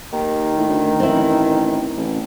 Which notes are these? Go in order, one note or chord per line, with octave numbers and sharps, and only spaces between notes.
D#2 D#3
A2
D2
A1 C4 E4
A1